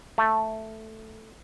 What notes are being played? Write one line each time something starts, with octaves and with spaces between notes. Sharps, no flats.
A3